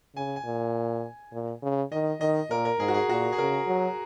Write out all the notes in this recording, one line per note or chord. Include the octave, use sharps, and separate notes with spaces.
C#3 G#5
G#5
A#2
A#2
C#3
D#3 D#5
D#3 D#5
A#2 A#4
A#4
G#2 G#4
F#4
G#4
A#2 F#4
G#4
C#3 A#4
F#3